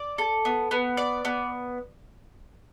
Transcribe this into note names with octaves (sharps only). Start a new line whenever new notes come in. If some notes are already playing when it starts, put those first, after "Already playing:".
Already playing: D5
A4
B3
B3
D5
B3